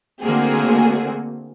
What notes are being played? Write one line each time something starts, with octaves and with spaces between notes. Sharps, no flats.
D3 A3 A#3 C4 F#4 G#4